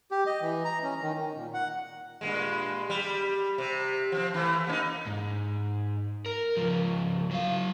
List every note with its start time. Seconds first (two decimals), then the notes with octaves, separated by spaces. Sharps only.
0.11 G4
0.27 D#5
0.41 E3
0.65 A#5
0.83 C#4
1.02 D#3
1.18 D#3
1.36 A#2
1.54 F#5
2.21 G2 A#2 G#3
2.90 G3
3.58 C3
4.12 F3 C4
4.34 E3 A3
4.67 A#3 C#4 D#4
5.06 G#2
6.26 A#4
6.57 C#2 F3
7.31 F#3 F5